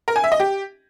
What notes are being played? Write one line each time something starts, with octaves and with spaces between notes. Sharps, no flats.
A#4
G#5
E5
D#5
G4